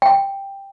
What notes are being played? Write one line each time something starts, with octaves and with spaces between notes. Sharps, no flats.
G5